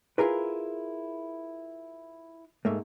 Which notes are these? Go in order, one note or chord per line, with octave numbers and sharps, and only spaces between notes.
E4 F4 G#4 A#4 B4
G#2 A3 A#3